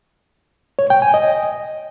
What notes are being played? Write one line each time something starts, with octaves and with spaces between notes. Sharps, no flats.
C#5
G5
G#5
D#5